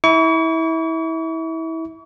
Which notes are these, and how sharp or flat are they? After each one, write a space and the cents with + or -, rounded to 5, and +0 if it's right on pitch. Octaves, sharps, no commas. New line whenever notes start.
E4 -25 C#6 +40